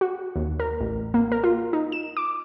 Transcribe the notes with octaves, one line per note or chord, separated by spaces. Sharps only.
F#4
D#2
A#4
A1
A#3
A#4
F4
D#4
E7
D6